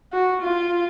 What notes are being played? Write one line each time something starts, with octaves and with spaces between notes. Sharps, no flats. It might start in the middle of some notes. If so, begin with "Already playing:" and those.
F#4
F4